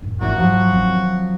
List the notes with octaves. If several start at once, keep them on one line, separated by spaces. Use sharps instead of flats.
F#2 A2
G#1 A#2 E3 E4 F#4
G#2 F3 F#3
D#3 C4